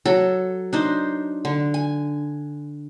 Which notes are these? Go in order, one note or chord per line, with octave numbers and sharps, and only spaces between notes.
F#3 A4
D4 D#4 C5
D3
G#5